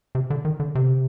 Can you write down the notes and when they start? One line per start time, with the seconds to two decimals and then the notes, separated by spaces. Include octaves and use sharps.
0.15 C3
0.30 D3
0.45 D#3
0.60 D3
0.75 C3